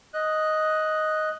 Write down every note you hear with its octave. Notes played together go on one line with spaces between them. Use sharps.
D#5 F#6